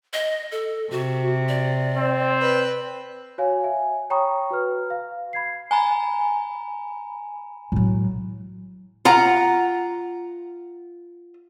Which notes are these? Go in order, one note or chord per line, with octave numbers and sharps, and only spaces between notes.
D#5
A4
C3 F#4
D5
C4
B4
F#4 C#5 F5 G#5
E5 G#5
C#5 G5 A#5 B5 C#6 D#6
F#4 B4 F6
F5
B5 G#6 C7
G#5 A#5 B5
A2 F#3
F4 F#5 A#5